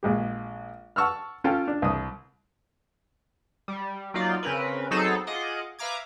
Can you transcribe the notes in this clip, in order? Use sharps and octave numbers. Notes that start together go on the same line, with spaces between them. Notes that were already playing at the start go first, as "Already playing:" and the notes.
A#1 G#3 G4
F#5 A5 C#6 E6 F6
C#4 F4 A4 F5 G5 A5
D4
C2 D#6
G3
F#3 A#3 D#4 F4 D5
C#3 C4 C#4 A#4 B4
F#3 B3 C4 D#4 G#4 A4
F4 G#4 D#5 F#5 D6
B4 E5 F5 A#5 D6 G#6